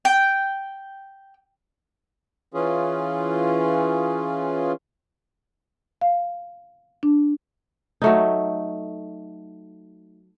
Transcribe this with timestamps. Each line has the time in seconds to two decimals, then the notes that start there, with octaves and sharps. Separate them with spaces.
0.05 G5
2.54 E3 C#4 F4 G#4
6.01 F5
7.03 D4
8.02 F#3 A3 D#4